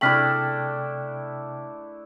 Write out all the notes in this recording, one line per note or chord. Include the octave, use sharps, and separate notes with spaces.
C3 A3 D4 E4 G5 F6 B6 F#7